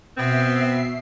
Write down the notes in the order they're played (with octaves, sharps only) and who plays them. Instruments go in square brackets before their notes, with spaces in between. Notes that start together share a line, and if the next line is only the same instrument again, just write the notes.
[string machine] B2 E5 C7 [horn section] B3 C4